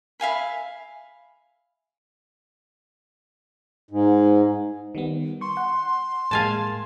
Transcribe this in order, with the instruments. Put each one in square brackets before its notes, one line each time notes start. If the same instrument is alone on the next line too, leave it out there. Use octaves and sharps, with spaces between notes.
[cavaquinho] E5 F5 G#5 B5
[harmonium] G#2
[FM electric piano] D#3 G3 B3
[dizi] C6 [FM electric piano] C#6
[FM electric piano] F#5
[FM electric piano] A2 G#3 A#3 [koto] F5 G#5 A5